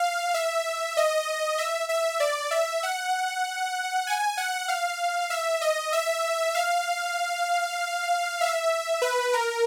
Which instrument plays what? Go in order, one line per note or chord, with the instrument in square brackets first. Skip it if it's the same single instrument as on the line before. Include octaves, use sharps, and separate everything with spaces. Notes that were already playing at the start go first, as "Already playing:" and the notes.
Already playing: [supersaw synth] F5
E5
D#5
E5
E5
D5
E5
F#5
G#5
F#5
F5
E5
D#5
E5
F5
E5
B4
A#4